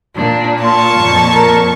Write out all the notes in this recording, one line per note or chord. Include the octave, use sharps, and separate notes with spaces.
A#2 D4
F4 A5 C#6
F2 A#2
A#4